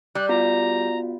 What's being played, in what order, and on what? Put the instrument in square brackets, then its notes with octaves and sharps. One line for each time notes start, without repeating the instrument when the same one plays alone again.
[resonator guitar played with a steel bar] G3 [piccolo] F#6
[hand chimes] B3 F4 F#4 [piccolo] A#5